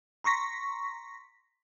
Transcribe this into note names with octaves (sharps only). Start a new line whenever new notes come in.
A#5 C6 C#6 A#6 B6